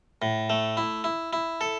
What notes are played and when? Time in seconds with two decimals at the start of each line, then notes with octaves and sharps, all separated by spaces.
0.22 A2
0.50 A3
0.77 E4
1.04 E4
1.33 E4
1.61 A4